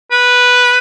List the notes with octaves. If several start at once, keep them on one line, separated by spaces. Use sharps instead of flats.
B4